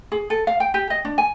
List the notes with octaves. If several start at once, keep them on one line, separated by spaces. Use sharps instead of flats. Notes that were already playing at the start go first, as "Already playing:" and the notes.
G#4
A4
F5
G5
G4
D#5
D4
G#5